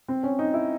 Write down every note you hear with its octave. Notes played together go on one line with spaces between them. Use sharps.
C4
C#4
D#4
E4